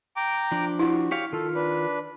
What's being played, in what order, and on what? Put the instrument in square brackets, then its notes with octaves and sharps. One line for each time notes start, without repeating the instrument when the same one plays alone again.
[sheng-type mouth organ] G5 A#5 D6
[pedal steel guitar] F3 D4
[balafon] E4 [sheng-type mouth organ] F#4
[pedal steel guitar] G4 C#5 F5
[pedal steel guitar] D#3 F4 F6 [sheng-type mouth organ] A4
[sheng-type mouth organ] D4 B4